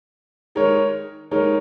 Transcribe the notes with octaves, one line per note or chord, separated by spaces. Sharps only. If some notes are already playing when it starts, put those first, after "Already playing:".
D#3 G#3 D#4 A#4 C#5
D#3 G#3 D#4 A#4 C#5